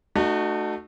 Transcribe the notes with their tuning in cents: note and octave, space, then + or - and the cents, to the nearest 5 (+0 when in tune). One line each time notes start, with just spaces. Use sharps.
A3 +0 D#4 -40 F#4 +0